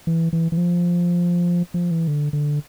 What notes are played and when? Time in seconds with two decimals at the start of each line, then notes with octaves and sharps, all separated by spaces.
0.07 E3
0.33 E3
0.52 E3
0.57 F3
1.74 F3
1.91 E3
2.08 D3
2.33 D3